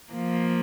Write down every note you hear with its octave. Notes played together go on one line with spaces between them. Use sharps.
F3 A#3